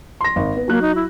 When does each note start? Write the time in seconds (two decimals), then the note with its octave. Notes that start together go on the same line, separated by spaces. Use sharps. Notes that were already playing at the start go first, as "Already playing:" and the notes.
0.21 C6 A#6
0.36 G#1
0.56 B3
0.68 F#3 A#3 F#6
0.82 D#4
0.95 E4